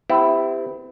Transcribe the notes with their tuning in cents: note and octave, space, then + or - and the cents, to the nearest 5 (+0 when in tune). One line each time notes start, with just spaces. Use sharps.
C4 -40 E4 +0 G4 +15